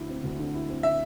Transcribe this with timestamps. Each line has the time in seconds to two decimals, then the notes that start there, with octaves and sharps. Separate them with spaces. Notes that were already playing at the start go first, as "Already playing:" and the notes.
Already playing: D2 D3 E4
0.09 C4
0.24 D2
0.39 D3
0.54 E4
0.69 C4
0.83 E5